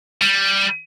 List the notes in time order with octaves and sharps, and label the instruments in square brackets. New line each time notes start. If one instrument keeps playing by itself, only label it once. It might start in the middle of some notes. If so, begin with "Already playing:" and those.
[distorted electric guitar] G3